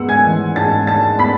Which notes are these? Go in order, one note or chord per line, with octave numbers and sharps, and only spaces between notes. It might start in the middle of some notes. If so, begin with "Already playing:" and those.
Already playing: G#2 G#3 B3 F#5 E6
G#5 G#6
E3
G#2 A5 A6
G#3 A5 A6
B3 B5 B6